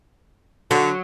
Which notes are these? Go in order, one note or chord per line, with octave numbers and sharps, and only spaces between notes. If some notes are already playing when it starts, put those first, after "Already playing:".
D3 F#3